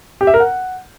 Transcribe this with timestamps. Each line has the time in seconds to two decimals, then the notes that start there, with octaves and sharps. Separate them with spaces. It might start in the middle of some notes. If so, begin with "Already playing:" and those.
0.21 G4
0.27 E5
0.34 A#4
0.40 F#5